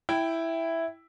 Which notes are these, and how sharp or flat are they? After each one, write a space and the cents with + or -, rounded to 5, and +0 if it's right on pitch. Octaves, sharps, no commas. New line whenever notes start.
E4 +0 G5 +0